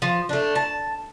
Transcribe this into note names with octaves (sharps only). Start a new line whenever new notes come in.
F3
A3 D4
A5